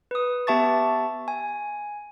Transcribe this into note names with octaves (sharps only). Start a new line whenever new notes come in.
B4 D#6
B3 G4 E5 A5 C#6 A6
G#5